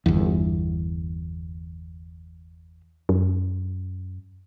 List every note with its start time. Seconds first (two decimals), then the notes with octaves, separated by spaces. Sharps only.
0.06 G1 E2
3.09 F#2